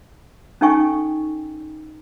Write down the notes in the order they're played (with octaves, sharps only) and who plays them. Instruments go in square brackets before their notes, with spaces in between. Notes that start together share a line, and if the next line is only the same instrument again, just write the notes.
[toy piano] C#4 D#4 A4 G5 G#5 C#6